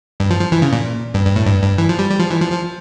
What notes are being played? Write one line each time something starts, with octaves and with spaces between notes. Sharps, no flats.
G2
F3
F3
E3
C#3
A#2
G2
G2
A2
G2
G2
E3
F3
G3
G3
F3
E3
F3
F3